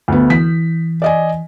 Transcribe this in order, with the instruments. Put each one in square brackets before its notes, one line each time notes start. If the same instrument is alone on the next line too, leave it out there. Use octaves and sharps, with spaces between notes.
[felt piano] D2 B3
[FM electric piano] E3 [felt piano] B6
[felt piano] D5 D#5 G#5